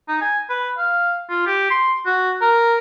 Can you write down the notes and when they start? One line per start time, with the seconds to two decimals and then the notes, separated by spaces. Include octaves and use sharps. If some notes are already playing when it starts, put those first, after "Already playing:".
0.08 D#4
0.21 G#5
0.50 B4
0.78 F5
1.30 F4
1.46 G4
1.71 C6
2.06 F#4
2.41 A#4